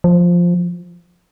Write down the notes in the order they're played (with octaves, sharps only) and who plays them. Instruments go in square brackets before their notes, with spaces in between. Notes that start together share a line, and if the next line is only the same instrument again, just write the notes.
[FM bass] F3